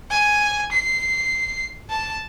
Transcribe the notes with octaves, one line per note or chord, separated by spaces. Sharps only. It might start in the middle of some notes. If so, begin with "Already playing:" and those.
G#5
C7
A5